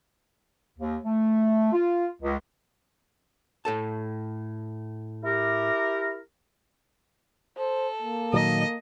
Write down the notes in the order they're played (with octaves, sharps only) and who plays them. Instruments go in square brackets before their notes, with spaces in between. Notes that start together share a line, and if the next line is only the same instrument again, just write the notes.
[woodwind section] D#2
A3
F4
C#2
[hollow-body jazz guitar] A2 A4 A5
[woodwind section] E4 G4 A#4
[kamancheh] A4 [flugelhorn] C5
[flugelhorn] A#3
[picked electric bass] A#2 D#3 F#3 [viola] D#5